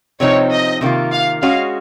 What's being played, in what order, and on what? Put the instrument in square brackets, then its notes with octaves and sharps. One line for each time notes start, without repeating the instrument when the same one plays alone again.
[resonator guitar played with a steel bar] C3 F3 C4 D#4 [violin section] C#5
[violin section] D#5
[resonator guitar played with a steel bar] C3 D#3 A#3 F4
[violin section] F5
[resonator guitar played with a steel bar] G#3 C#4 F#4 [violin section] F5